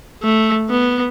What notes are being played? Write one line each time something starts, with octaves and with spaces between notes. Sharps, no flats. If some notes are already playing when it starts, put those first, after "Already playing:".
A3
B3